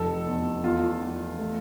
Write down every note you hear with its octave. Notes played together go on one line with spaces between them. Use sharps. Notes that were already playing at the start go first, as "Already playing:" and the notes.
Already playing: F1 A4
E2
E2 F4
E2
A3